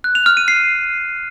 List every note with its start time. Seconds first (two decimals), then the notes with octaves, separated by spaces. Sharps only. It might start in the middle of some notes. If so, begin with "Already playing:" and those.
0.04 F#6
0.15 F7
0.26 F6
0.37 D#7
0.48 C7